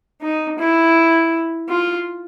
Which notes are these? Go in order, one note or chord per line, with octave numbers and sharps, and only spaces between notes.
D#4
E4
F4